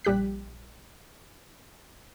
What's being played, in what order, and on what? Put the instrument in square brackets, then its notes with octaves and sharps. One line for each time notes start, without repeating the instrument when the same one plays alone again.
[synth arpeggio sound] A#1 G3 G4 F#6 B6